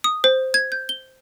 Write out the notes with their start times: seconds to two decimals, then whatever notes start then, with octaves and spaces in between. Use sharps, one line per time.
0.04 D#6
0.24 C5
0.54 G#6
0.72 G6
0.89 G7